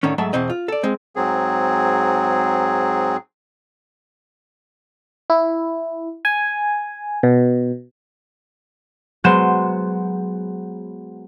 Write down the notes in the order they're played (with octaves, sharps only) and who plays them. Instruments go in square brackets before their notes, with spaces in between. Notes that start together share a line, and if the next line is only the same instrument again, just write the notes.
[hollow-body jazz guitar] A2 D3 D#3 C#4
G#2 F#3 A3 E5 A5
E2 B2 C4 D#5
F4
A4 D5
G#3 C4
[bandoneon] G#2 F#3 C4 G#4
[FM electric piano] E4
G#5
B2
[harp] F#3 G#3 B3 C5 G6 E7